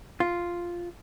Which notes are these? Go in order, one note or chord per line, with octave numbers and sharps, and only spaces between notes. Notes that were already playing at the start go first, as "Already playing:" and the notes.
F4